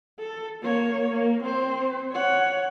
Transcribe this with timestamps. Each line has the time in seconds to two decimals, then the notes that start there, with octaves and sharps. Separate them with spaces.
0.19 A4
0.62 A#3 C#5
1.11 A#3
1.43 C4 C5
2.13 C#5 F#5